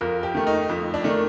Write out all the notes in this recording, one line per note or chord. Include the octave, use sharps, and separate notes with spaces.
F2 A#4
G4
D#3 A3
D#4
F2
D4
D#3 A3